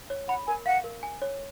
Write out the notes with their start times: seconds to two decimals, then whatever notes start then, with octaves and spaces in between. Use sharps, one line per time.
0.10 C#5
0.28 F#5 B5
0.47 A#4 G#5
0.66 F5 F#5
0.84 A#4
1.03 G#5
1.22 C#5